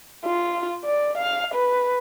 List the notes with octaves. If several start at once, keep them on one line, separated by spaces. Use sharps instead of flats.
F4
D5
F5
B4